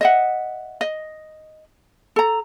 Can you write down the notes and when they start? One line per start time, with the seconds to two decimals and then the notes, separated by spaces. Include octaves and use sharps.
0.01 D#5 E5 F#5
0.81 D#5
2.16 A4 A#5